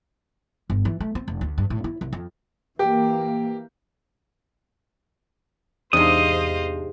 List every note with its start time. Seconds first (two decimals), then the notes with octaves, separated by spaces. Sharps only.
0.70 G1
0.85 E3
1.00 A3
1.15 C4
1.28 F1
1.41 D2
1.58 G2
1.70 A2
1.84 E4
2.01 C2
2.13 F2
2.79 E3 A#3 G4
5.93 E2 G#2 C3 D4 C5 D#5 F5 D#6